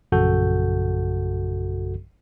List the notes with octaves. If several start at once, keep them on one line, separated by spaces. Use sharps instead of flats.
A#1 F#2 C#3 F#4 A4 G6